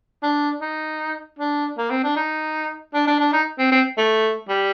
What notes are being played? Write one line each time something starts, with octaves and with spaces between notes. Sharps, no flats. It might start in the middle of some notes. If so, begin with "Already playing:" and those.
D4
D#4
D4
A#3
C4
D4
D#4
D4
D4
D4
D#4
C4
C4
A3
G3